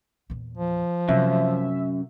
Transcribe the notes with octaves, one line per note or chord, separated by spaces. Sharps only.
E2 A#2
F3
F#2 C3 A3 E5